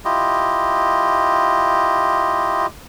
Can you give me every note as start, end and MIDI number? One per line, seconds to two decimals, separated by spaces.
0.05 2.66 64
0.05 2.66 65
0.05 2.66 67
0.05 2.66 75